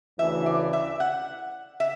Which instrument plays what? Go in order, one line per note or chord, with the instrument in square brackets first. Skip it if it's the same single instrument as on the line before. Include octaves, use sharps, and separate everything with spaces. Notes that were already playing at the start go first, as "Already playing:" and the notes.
[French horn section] D2 C#3 E3 [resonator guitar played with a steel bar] E5
[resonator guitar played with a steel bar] D5
E5
F#5
E5